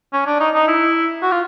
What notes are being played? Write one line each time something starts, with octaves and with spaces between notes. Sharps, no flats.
C#4
D4
D#4
D#4
E4
F#4
F4